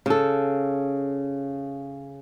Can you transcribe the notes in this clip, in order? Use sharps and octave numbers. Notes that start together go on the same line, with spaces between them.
C#3 A4